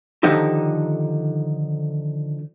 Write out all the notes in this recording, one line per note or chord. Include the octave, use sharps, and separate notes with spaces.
D3 D#3 F3 D#4 G4 A4